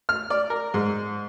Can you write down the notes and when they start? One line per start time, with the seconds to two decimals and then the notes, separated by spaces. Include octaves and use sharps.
0.09 F6
0.30 D5
0.50 A#4
0.74 G#2